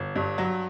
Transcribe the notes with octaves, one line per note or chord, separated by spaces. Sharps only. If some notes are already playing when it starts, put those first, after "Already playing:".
Already playing: G1
G2
F#3